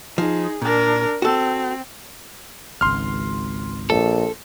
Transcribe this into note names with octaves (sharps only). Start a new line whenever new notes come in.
F3 D#4 G#4
A#2 D4 A#4
C4 F#4 A4
G#1 C#2 C6 F6
A#1 A4